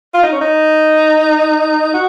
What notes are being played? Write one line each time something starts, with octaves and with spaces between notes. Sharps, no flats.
F4
D#4
C#4
D#4
F#4